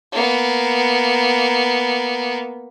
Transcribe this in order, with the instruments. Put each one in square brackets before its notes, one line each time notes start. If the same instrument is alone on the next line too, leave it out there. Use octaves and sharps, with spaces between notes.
[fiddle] A#3 B3